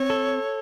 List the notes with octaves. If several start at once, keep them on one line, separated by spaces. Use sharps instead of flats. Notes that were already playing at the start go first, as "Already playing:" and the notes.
Already playing: C4 C#5
A4